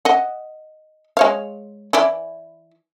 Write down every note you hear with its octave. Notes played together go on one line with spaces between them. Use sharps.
D#5 F#5
G#3 C#5 F5
E3 E4 D5